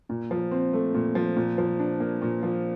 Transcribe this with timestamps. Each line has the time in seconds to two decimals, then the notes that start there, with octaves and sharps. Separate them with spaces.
0.09 A#2
0.31 F3
0.51 C4
0.73 A3
0.94 A#2
1.15 F3
1.36 A#2
1.58 F3
1.79 D4
2.00 A#3
2.22 A#2
2.43 F3